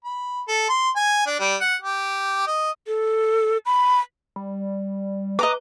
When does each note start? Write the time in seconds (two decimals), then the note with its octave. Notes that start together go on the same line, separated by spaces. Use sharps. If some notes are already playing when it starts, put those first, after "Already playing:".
0.04 B5
0.48 A4
0.69 C6
0.96 G#5
1.26 D4
1.40 G3
1.61 F#5
1.82 G4
2.47 D#5
2.87 A4
3.66 B5
4.36 G3
5.39 B4 D#5 A#5 D6